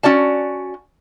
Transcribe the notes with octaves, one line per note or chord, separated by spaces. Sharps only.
C#4 F#4 D5 A5